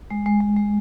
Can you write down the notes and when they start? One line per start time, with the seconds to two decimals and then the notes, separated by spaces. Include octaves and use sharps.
0.10 G#3
0.26 G#3
0.41 G#3
0.57 G#3